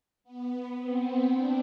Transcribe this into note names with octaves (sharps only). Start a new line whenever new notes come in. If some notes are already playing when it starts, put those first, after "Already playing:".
B3
C4
C4 D4